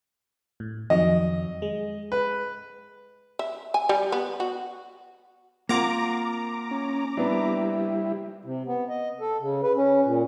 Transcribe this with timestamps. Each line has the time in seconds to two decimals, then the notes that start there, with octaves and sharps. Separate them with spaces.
0.60 A2
0.90 F2 D#3 F#3 D#5
1.62 G#3
2.12 B4
3.39 E5
3.74 G#5
3.89 G3
4.12 B3
4.40 F#4
5.69 A#3 C4 F4 A#4 F#5 A#5 D6
6.71 C#4
7.17 G3 B3 D4 E4
8.45 C3
8.66 B3
8.89 D#5
9.21 A4
9.41 C#3
9.63 B4
9.76 C#4
10.04 A#2